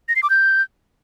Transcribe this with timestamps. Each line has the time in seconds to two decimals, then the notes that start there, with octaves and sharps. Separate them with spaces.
0.09 A#6
0.16 C7
0.23 D6
0.30 G6